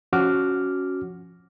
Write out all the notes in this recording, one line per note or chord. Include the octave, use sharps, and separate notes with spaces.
F3 C#4 F#4 D6 F6